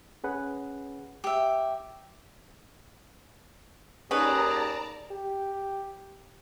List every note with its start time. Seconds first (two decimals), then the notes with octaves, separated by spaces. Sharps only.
0.24 C#4 G#4 B4 F#5
1.24 G4 E5
4.11 D#2 C#4 G#4 B4 D5 A5 A#5
5.11 G4